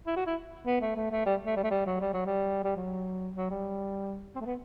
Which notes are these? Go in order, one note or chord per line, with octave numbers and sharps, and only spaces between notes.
E4
F#4
E4
B3
A3
A3
A3
G3
A3
G3
A3
G3
F#3
G3
F#3
G3
G3
F#3
F#3
G3
C4
A3
B3